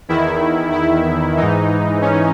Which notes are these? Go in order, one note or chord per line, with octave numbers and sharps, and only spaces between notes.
E2 D#3 E4
E4
G#2 E3 D#4
C#4